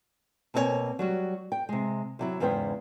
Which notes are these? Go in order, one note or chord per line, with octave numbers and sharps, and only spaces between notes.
B2 A#3 C4 F4 C#5 G#5
F#3 G3 F#4
G5
C3 G#3
C3 F#3 E4
E2 G#2 C#3 B3 C5 G5